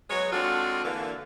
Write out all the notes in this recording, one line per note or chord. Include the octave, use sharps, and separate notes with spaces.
F#3 G#3 B3 C#5
G#3 C4 D4 F4 F#4 A4
D3 E3 A#3